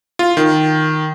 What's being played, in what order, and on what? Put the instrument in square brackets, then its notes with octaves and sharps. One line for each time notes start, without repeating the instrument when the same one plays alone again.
[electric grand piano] F4
D#3